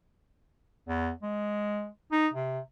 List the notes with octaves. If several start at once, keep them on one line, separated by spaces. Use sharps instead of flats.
E2
G#3
D#4
C3